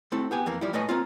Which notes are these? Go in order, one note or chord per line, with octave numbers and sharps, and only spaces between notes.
A3 C4 E4 A4
B3 G4 G#5
F2 E3 A#3
F3 G3 E4
A2 A3 B4 D#5 G#5 A#5
A#3 C4 F4